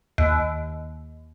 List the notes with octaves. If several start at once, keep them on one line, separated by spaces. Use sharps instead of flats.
D#2